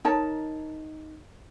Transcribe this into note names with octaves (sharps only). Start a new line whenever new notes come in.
D#4 A#4 C#5 A5